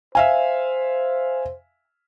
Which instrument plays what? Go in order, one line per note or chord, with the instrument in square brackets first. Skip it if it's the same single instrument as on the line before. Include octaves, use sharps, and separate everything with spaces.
[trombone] C5 [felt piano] E5 F5 G#5